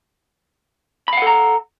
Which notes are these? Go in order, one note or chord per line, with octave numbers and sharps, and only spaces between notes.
A4 F5 F#5 A#5 B5